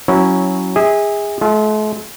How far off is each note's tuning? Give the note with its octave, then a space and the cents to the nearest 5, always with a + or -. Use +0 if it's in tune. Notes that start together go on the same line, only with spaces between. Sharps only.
F#3 +0 C#4 -5 E4 -15
G#4 -25 E5 -35
A3 -45 F4 +0